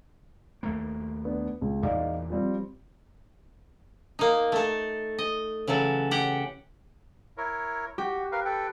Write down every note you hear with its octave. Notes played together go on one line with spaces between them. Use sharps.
D#2 A3 A#3
B3 D4
C#2
E2 A#2 E3 D#4 D5 F5
F3 G3 C4
A#3 D#4
A3 A4
D#5
C#3 E3 F#3 A4
G4 F#5 G5
E4 A#4 C#5
F#4 G4
A#4 B4 F5
A4 B4 G5